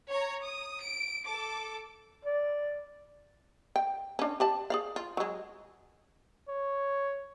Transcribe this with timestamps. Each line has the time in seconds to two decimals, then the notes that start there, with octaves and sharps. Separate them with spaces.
0.10 C#5 A#5
0.44 D#6
0.82 D7
1.26 A4 D6
2.26 D5
3.76 G5
4.19 C#4 D4
4.40 G4 D5 A5
4.70 G#4 D5 F5
4.96 F4
5.17 F#3 G#3
6.48 C#5